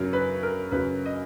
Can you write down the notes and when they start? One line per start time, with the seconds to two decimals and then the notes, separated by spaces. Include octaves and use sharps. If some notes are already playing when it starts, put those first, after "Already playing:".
Already playing: F#2 C#3 F#3 A#4
0.13 B4
0.43 A#4
0.71 F#2 C#3 F#3 B4
1.05 D#5